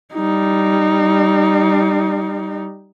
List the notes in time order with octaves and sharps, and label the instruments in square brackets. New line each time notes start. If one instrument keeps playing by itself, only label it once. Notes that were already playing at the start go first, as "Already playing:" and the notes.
[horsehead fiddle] G3 D#4